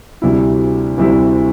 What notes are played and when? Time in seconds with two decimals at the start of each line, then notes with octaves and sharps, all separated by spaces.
0.22 D2 C3 G3 E4
0.98 D2 C3 G3 E4